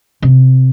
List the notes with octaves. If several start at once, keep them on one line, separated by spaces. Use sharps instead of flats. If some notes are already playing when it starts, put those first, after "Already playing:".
C3